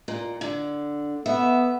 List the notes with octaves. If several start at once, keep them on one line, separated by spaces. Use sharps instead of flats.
A#2
D3
B3 E5